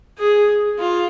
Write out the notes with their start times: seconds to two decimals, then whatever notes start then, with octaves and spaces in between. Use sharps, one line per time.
0.19 G#4
0.79 F4